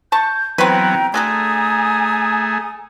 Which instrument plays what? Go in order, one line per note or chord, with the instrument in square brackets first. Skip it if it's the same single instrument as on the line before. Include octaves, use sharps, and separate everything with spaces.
[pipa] A5 C#6 [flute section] G6
[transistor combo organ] E3 F#3 B3 [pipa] C4 F#4 B4 [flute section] G5 A#5
[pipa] D3 F#4 A4 [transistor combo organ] A3 G#4 [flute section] G#5 A#5 D#6